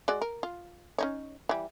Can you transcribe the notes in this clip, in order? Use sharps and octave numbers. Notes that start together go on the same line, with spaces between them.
G#3 F#4 D5
A#4
F4
C#4 D#4 C#5
E3 G3